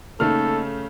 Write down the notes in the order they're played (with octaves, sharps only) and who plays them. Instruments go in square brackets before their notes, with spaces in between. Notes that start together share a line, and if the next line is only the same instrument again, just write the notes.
[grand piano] C#3 A3 F6 [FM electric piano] A#3 D#4 [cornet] A4